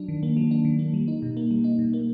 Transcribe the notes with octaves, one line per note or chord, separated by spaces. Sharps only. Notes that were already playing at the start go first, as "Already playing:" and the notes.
Already playing: F#3 D4
D#3
A#3
F#3
D4
D#3
A#3
G3
D#4
B2
A#3
G3
D#4
B2
A#3